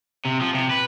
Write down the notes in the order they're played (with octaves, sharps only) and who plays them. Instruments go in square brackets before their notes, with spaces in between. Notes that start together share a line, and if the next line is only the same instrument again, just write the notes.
[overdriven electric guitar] C3
F3
C3
B4